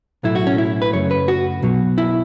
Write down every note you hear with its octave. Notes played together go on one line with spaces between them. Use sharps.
B1 A2 F#3 A3 E4
F#4
C#4
E4
B4
F#2 C#3 F#3 A3 C#5
B4
F#4
B1 B2 F#3
E4